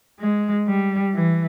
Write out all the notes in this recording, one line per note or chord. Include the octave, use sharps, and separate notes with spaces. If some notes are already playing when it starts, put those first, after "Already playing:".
G#3
G3
E3